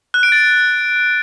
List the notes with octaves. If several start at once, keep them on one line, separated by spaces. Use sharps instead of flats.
F#6
D7
A6